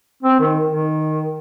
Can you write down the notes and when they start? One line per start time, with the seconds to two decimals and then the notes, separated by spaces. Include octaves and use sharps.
0.23 C4
0.40 D#3
0.71 D#3